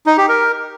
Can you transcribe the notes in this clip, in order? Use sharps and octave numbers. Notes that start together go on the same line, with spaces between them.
D#4
G4
A#4